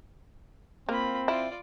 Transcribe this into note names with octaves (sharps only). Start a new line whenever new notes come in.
A#3 C4 F4 B5
E4 F4 D5